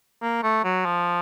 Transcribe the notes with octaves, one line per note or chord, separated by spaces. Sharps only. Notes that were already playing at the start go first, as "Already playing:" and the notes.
A#3
A3
F#3
F3